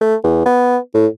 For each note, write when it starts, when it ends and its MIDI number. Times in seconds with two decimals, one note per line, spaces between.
0.01 0.16 57
0.24 0.43 40
0.46 0.77 59
0.94 1.07 45